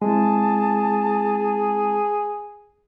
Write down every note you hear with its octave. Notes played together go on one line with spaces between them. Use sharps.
G#3 C4 E4 G#4 A5